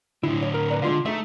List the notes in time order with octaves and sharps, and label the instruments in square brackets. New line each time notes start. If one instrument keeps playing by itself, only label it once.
[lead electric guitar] A2 D3 [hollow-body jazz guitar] E4
[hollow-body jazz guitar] B1 C#5
A#4
B4 D5 A#5
[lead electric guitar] D3 [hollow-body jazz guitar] G#3 F4 F5
[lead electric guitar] A3 [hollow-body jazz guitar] D#4 G#4 E5